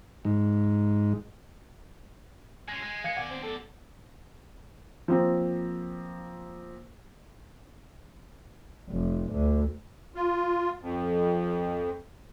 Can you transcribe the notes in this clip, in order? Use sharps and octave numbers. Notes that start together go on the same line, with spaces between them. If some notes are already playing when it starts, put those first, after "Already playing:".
G#2
G#3 C#4 G#5
G#3
F5 G#6 C#7
B2 D5 F#5
C4
A4
F3 A#3 C4
F1
D2
F4
F2